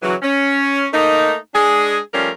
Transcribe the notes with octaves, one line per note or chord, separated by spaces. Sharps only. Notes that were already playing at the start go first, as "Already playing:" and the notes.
C#3 E3 F#3
C#4
A3 A#3 D#4
G#3 D4 G#4
F3 G3 A3 C#4 A#4